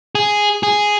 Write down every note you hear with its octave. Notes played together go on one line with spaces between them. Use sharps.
G#4
G#4